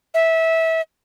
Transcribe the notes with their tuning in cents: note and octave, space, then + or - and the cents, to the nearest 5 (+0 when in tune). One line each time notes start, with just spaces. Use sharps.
E5 -20